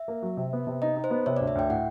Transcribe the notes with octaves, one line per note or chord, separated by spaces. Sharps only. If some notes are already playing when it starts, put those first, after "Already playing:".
Already playing: E5
A#3
F#3
C3
B3
C3
D#4 D#5
D#4
C5
B3
C3 C#5
D2 D5
E5
D2 G5
A2 F#5